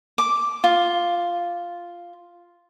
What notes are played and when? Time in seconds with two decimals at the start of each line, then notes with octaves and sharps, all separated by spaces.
0.18 D6
0.64 F4